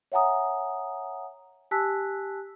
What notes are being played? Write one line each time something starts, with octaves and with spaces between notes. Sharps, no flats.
C#5 E5 F#5 G#5 A#5 D#6
G4 G#5 A5 E6 F#6 B6